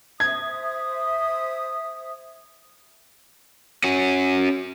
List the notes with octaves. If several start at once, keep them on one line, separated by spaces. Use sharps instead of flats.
C5 E5 D#6 G#6
C#4 F#4